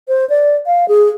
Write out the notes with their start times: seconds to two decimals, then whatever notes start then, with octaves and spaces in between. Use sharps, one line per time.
0.08 C5
0.30 D5
0.66 F5
0.88 G#4